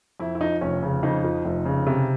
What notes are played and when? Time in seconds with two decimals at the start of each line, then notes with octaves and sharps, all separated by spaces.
0.20 F2 E4
0.35 E4
0.41 F3 D#4
0.61 F1 C#4
0.83 C#3
1.03 F2 D#4
1.24 F3
1.45 F1
1.65 C#3
1.87 C3